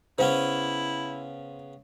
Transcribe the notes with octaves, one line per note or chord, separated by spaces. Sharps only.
C#3 B3 C#4 E4 C5